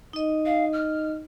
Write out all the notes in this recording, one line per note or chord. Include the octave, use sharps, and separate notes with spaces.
D#4 D#5
F5
F6